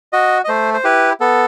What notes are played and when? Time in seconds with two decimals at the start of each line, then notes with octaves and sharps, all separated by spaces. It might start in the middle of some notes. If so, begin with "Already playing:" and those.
0.13 F#4 D#5
0.44 D#5
0.48 A3 C5
0.74 C5
0.84 E4 G4 B4
1.20 B3 A4